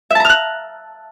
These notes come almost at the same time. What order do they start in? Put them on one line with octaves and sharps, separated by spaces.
E5 A5 A#5 F6 F#6